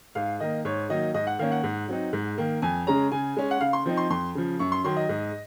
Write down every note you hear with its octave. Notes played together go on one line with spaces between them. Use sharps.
G#2 F5
D#3 A#3 D#5
G#2 C#5
D#3 F#3 A#3 D#4 D#5
G#2 D#5
F#5
D#3 A#3 C#4 F5
F#5
G#2
F#3 C4 D#4
G#2
D#3 A#3
F2 G#5
C#3 G#3 C#4 A#5
C#3 G#5
G#3 C#4
F#5
C#3 F5
C6
F3 C4 D#4
C6
F2 C6
C#3 F3
F#2 C#6
C6
D#3 F#3 C6
D#5
G#2